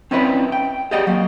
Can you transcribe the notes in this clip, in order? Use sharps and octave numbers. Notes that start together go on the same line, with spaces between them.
C4 C#4 D#4 E4 B4 D5
G5
G4 G#4 D5 D#5 F#5 G5
F#3 A#3